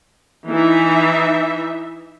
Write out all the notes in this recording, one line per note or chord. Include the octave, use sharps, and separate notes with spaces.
E3 D#4 E5